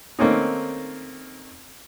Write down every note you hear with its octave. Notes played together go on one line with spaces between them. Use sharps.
D#3 A3 A#3 C4 C#4 D#4